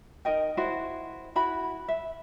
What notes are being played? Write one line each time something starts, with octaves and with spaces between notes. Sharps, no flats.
D#4 A#4 D#5 G5
E4 F#4 C5
E4 F#4 B5
E5